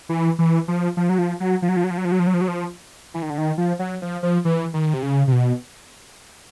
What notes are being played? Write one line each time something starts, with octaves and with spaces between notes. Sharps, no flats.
E3
E3
F3
F3
F#3
F3
F#3
F3
F#3
F3
F#3
F3
F#3
F3
F#3
F3
F#3
F3
F#3
F3
E3
D#3
D3
D#3
F3
F#3
F3
F3
E3
D#3
C3
C#3
C3
B2